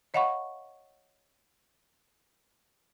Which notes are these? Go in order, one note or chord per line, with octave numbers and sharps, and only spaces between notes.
C#5 D#5 F5 F#5 B5 C#6